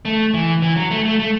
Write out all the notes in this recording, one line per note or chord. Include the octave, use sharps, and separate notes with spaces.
A3
E3
E3
F#3
A3
A3
A3